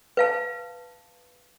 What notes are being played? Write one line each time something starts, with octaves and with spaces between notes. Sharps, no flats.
B4 F5 A5